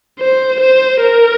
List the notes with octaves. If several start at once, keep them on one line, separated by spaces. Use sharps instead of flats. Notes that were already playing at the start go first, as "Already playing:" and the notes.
C5
C5
A#4